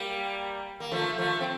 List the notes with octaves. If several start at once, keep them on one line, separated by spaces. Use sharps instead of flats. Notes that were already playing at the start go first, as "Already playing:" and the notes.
Already playing: G3 A#3
A#3
F3 A3
F3 A3
C4